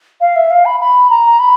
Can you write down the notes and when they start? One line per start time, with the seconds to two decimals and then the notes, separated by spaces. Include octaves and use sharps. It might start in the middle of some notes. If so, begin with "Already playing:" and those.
0.21 F5
0.36 E5
0.50 F5
0.65 B5
0.80 B5
1.10 A#5
1.39 B5